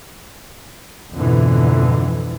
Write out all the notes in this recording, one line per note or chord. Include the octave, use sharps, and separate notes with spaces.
F2 G#2 B2 D3 E3